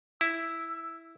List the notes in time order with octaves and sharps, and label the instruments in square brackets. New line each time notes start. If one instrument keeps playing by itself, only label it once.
[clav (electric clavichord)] E4 [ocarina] E6